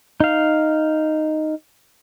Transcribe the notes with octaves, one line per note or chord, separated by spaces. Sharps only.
D#4 F5